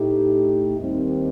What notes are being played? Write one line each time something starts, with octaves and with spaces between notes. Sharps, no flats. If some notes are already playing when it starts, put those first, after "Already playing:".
Already playing: A2 A3 D#4 G4
D#2 D#3 G3 C4